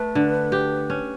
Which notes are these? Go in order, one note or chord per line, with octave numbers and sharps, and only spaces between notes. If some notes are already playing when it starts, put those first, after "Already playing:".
Already playing: A3 B4
D3
G4
C#4